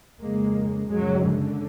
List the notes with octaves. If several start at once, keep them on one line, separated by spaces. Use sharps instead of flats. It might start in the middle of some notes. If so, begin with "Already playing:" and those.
F2 C#3 G#3 A#3
F#2 C#3 F#3 G#3
D3